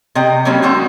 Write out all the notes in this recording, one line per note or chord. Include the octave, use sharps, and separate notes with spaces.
C3 D#5 G5
F#3 G3 A#3 C4 C#4
D#3 G#3 C4 F#4